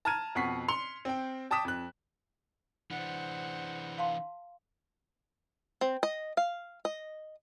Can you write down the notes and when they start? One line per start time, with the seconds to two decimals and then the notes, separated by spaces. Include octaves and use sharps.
0.05 A5 A#5 F6 G#6 D#7
0.35 F2 B2 F#5 C#6 B6 C7
0.68 C6 C#7 F7
1.05 C4 G5
1.51 G5 A5 D6 D#6 B6 E7
1.65 F2 F#6
2.91 E3 D4 C5 F#5
3.98 F5 A5 C6
5.81 C4
6.03 D#5
6.37 F5
6.85 D#5